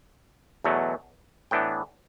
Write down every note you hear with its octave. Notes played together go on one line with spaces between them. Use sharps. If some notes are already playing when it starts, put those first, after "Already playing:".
E2 B2 F#3 A3
A2 E3 B3 D4 G5